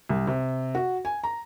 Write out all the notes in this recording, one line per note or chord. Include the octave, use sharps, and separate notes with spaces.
C2
C3
F#4
G#5
A#5